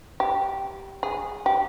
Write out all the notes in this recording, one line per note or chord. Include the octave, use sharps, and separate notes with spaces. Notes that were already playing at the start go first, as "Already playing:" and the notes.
G4
G#4
G4